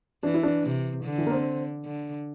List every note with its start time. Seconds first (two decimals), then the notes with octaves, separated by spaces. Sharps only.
0.23 E3 D4
0.34 E4
0.43 D4
0.65 C3
1.04 D3
1.18 E3
1.27 A#3
1.31 C4
1.85 D3